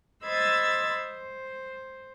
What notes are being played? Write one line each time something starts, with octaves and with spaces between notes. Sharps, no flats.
C5 D#5 B5 E6 G#6 A6
C5